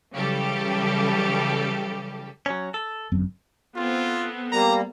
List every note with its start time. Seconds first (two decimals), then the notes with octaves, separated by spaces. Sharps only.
0.14 C#3 E3 F#3 G3 G4 A4
2.46 F#3 C#4
2.74 A4
3.12 G1 F#2 C4
3.76 B3 C4 F4 A4
4.52 G3 A#3 A#5